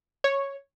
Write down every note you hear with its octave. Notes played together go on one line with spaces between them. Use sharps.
C#5